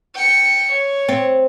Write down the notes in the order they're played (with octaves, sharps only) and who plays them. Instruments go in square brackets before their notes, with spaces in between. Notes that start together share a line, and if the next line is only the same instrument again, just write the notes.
[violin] G5 C#7
C#5
[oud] C4